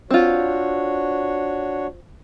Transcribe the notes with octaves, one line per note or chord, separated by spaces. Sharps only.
C4 D4 F4 F#4 C#5